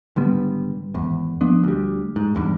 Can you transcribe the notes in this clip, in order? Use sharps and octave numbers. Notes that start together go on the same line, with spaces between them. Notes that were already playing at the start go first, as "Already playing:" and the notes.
G#1 D3 G3 B3
G#1 E2
F3 B3 D4
D2 G3
G#2
G#1 E2 G2